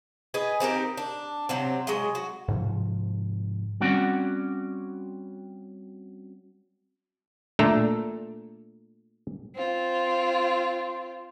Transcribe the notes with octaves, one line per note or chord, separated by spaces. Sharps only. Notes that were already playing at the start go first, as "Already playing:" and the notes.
G#4 B4 D#5 G#5
C4 D#4 G4 A#4
D4
C3 F#3 C4
F#3 G#3 D#5
F#4
G#2 C3 F3
G3 C4 C#4 F#4 D5 F#5
A#2 A3 D4 A4 E5 A#5
C4 F4